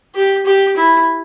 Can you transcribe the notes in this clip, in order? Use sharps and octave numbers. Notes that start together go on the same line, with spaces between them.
G4
G4
E4